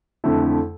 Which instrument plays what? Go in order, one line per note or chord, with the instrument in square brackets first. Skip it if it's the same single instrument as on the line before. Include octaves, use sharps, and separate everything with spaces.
[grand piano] F2 D3 A3 E4